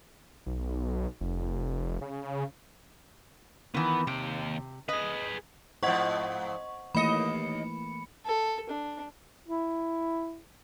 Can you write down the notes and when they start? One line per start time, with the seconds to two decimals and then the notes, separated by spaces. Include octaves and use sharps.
0.46 B1
1.21 F1
2.01 C#3
3.75 D#3 E3 B3
4.07 D#2 C3 G5
4.89 G#4 B4 D#5
5.83 G#2 F3 C5 D#5 F#5 C#6
6.95 D#2 E3 A3 A#3 D#5 B5 C#7
8.25 A4
8.70 D4
9.48 E4